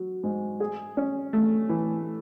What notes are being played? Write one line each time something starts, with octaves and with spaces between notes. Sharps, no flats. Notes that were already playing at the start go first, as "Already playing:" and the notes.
Already playing: F#3
G#2
G#4
C#4
A3
E3